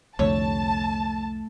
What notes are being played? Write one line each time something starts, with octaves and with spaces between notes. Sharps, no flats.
C2 F2 D3 A3 C#5 A5